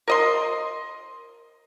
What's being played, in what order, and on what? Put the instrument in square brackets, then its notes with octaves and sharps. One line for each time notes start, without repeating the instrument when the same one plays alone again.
[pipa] A#4 D#5 C6